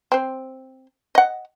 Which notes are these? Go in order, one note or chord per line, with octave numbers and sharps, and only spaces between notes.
C4 C5
D#5 F#5